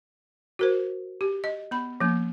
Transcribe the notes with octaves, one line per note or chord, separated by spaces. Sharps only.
F#4 A#4 C5
G4
D#5
B3 B5
F3 A#3 C#4